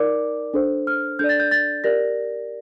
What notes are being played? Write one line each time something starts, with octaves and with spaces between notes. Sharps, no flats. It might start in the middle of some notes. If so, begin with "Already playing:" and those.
Already playing: D#4 A#4 D5 D6
D4 A4 C5
F6
D4 A4 D5 G6
A6
G6
A6
G4 A#4 D5 A#6